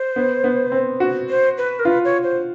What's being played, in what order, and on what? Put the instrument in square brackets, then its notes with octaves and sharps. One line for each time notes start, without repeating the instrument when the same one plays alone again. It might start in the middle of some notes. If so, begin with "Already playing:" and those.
Already playing: [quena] C5
[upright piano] B3
B3
C4
F#4
[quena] C5
B4
A#4
[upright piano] F4 [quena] B4
[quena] C#5
C5